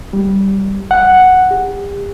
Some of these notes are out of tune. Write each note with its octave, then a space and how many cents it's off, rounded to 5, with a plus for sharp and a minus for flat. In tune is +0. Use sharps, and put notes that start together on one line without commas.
G3 -5
F#5 +0
G4 +40